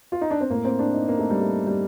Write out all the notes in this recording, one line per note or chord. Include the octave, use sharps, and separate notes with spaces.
F4
D#4
D4
C4
A2 A#3
C4
D4
D#4
A#3
A3
G3
A3
G3